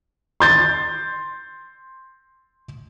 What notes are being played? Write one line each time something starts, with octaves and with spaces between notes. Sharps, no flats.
C6 G6 A6